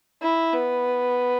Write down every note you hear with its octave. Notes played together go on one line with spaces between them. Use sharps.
E4
B3